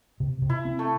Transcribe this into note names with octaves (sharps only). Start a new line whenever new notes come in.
C3
C3
E4
C4
A3 A4